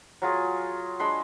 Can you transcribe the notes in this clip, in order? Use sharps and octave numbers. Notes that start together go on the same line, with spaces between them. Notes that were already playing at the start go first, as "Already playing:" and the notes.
F#3 F4 G#4
G#3 D4 B5 C6